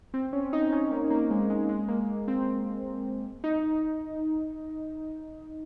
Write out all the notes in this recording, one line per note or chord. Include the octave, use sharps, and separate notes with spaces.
C4
C#4
D#4
C#4
A#3
A#3
G#3
G#3
G#3
A#3
C4
D#4